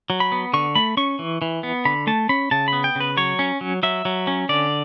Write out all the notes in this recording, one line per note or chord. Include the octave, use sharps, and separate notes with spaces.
F#3
B5
B3
D3 C#6
A3 B5
C#4 C#6
E3
E3
B3
D3 B5
A3 A5
C#4 B5
C#3 A5
B3 B5
G5
C#3 B4
F#3 C#5
C#4
F#3
F#3 E5
F#3
C#4
D3 D5